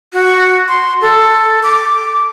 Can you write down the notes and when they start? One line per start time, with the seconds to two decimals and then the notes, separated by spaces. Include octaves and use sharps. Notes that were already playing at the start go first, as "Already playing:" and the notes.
0.13 F#4
0.68 C6
1.01 A4
1.63 D6